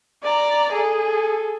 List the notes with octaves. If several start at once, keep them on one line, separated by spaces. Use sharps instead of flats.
D5 A#5
G#4 A4